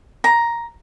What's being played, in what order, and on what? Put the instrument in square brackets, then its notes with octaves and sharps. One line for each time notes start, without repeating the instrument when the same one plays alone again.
[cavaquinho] A#5